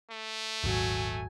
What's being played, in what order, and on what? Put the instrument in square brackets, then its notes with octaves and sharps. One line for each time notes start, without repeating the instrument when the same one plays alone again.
[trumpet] A3
[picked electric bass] D#1 G#1 [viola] F#3 G#5